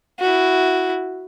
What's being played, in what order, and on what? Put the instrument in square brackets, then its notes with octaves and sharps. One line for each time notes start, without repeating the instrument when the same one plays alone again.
[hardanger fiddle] E4 F#4